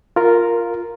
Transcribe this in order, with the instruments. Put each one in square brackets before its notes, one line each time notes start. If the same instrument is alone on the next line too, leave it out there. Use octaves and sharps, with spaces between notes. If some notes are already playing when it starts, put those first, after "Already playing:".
[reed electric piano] F4 A#4